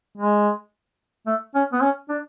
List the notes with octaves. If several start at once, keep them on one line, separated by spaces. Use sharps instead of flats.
G#3
A3
C#4
B3
C#4
D4